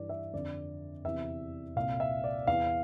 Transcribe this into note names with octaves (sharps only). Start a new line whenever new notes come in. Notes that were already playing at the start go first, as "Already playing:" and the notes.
Already playing: G2 E3 D5
E5
F2 D3 D5
E2 C3 E3 E5
C2 A#2 F5
E5
D5
E2 E3 F5